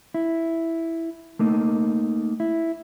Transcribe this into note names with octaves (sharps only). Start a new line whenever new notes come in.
E4
A3 A#3 D#4
E4